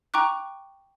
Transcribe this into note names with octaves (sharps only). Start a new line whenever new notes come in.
G5 A#5 C#6 D6 F#6